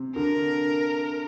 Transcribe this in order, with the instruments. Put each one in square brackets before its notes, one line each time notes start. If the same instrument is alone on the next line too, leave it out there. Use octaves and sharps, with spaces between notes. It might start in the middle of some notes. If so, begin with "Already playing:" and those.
Already playing: [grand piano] C3
[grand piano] D3 [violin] A#4